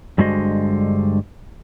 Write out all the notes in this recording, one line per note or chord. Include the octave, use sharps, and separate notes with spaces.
G2 D3 G#3 F#4 C5 D#5